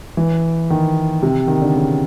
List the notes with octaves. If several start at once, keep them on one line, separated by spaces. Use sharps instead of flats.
E3
D#3
C3
D#3
D3
C#3